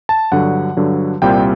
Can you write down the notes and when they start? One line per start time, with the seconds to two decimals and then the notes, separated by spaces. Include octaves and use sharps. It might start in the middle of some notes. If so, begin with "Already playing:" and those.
0.09 A5
0.32 G2 D3 F#3 F#5
0.77 G2 D3 F#3
1.22 C2 A#2 G3 C4 G5